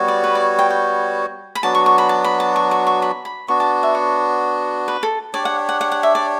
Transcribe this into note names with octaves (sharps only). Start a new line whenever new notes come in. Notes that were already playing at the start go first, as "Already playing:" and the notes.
Already playing: G3 B3 F#4 C#5
D5
B4
D5
G5
G5
B5
F#3 B3 D4 F#4 A5
C#6
C#6
B5
A5
B5
A5
C#6
C#6
C#6
B5
B5
B3 D4 F#4 C#6
A5
E5
C#5
B4
A4
D4 G4 C#5 D5
F#5
F#5
F#5
F#5
E5
D5